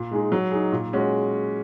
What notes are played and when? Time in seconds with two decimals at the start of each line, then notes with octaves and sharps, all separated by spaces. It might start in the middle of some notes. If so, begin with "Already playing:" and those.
Already playing: A#2
0.11 G#3 D#4 G#4
0.32 F#3
0.52 D#4 G#4
0.72 A#2
0.93 G#3 C#4 F#4